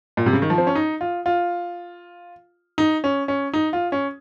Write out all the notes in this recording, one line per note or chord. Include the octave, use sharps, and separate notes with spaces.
A#2
C3
C#3
D#3
F3
C4
C#4
D#4
F4
F4
D#4
C#4
C#4
D#4
F4
C#4